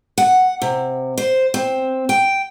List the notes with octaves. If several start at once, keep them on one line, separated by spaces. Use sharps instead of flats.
F#5
C3
C5
C4
G5